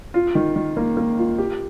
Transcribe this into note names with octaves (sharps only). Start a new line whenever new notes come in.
F4
D#3
D#3
A#3
A#3
F4
G4